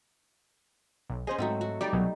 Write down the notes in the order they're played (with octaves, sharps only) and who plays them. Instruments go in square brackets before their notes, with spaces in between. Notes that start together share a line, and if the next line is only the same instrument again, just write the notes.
[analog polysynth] B1
[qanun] C#4 D#5 [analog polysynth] G#4 C5
[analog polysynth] G#2 [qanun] F#3 A3 C4
[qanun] F#4
[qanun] G3 D#4 [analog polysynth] D5
[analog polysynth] C2 B2 F#3